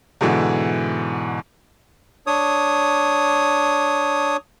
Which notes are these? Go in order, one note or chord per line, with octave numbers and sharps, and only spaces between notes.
G#2 B2 D3 E3
D4 C#5 D#6